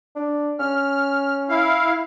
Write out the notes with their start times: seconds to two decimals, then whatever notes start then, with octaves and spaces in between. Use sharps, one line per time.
0.16 D4
0.59 C#4 F6
1.49 E4 F5